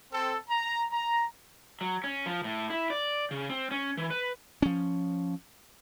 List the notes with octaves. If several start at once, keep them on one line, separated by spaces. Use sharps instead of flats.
C4 A4
A#5
A#5
F#3
C#4
F3
A2
E4
D5
C#3
C4
C#4
E3
B4
F3 C#4